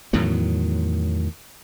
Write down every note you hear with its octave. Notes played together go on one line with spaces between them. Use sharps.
E2 A2 D#3 F#3